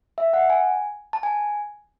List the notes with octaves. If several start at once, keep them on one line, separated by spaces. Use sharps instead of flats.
E5
F#5
G#5
A5
G#5